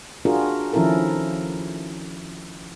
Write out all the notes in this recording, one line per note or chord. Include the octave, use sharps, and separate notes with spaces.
D4 F4 F#4 G#4 A#4
D#3 F3 C#4 E4 A4 A#4